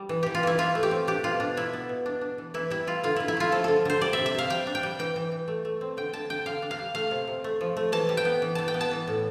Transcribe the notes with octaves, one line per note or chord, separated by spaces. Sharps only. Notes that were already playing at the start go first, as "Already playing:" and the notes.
Already playing: G3
E3
E3 G4
F4
E3 E4
E3 F4
A3
G4
C4
D4 G4
B2 F4
B2 D4
D4 E4
B3
B2
D4
D4
E3
E3 E4
G3 E4
G3 F4
D3 F4
D3 E4
E4
A3 F4
F3 A4
D3 A4
D3 C5
G3 D5
C3 E5
E5
C3 F5
G3 G5
D4
G5
G3
E3 G5
E3
E3
A3
A3
C4
D3 G5
D3 A5
D3 G5
D3 F5
D4
F5
G3
A3 F5
C3
C3
A3
F3
A3
E3 A5
G3
G5
B3
E3
E3 A5
G5
B3
A5
E3
A2